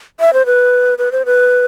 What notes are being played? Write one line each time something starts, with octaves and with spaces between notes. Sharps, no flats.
E5
C5
B4
B4
C5
B4